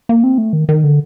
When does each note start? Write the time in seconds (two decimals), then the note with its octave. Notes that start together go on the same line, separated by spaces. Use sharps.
0.09 A#3
0.24 C4
0.38 A3
0.53 D#3
0.69 D#3
0.84 D3